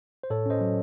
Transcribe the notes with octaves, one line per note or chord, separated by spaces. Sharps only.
C5
A2 A4 C#5
C#4 C5 D#5
F#3